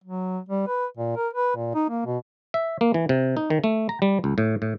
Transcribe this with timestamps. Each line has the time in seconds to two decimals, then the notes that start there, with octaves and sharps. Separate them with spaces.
0.04 F#3
0.49 G3
0.67 B4
0.97 A#2
1.16 A#4
1.34 B4
1.56 A#2
1.75 D#4
1.90 A#3
2.06 B2
2.54 E5
2.81 A#3
2.94 E3
3.09 C3
3.37 D#4
3.50 D#3
3.64 A3
3.89 A#5
4.02 G3
4.24 C#2
4.38 A2
4.62 A2